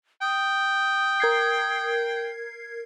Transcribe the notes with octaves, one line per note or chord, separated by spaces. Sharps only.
G5 D#6
A#4 G#6 C7